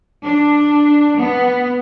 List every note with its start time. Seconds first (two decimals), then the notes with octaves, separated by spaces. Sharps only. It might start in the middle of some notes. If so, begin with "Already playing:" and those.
0.22 D4
1.19 B3